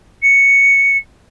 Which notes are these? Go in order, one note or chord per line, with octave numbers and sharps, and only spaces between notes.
C#7